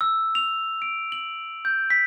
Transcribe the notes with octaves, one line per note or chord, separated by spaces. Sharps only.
E6
F7
D7
F#7
G6
B6